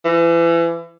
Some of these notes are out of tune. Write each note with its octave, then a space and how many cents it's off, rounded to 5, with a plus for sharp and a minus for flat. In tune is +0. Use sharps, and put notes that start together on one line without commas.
E3 +35